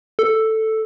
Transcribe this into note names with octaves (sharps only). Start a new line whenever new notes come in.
A4